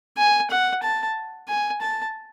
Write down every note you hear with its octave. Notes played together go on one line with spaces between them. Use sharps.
G#5
F#5
A5
G#5
A5